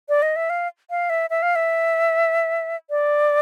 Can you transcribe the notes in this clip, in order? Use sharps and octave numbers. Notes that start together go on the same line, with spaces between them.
D5
D#5
E5
F5
F5
E5
E5
F5
E5
D5